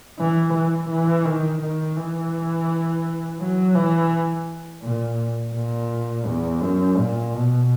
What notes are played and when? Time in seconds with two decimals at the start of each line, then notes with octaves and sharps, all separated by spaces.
0.19 E3
0.54 E3
0.89 E3
1.25 D#3
1.61 D#3
1.97 E3
3.40 F#3
3.75 E3
4.82 A#2
5.54 A#2
6.26 E2
6.61 F#2
6.98 A#2
7.34 B2